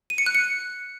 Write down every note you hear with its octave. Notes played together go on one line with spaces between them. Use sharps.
D#7
C#7
F#6
C#7